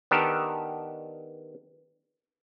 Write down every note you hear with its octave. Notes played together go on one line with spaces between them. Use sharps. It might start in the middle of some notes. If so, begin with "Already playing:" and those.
D#3 B3 D4 G4 A4 A#4